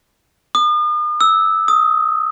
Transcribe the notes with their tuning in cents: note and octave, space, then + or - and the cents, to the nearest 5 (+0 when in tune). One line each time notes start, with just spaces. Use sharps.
D#6 -40
E6 -10
D#6 +5